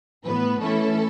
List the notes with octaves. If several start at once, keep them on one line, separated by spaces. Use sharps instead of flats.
A2 E3 B3 B4
E3 A3 C#4 E4 A4